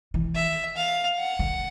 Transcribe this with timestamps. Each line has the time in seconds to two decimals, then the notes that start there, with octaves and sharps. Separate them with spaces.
0.14 E3
0.35 E5
0.77 F5
1.18 F#5
1.39 D3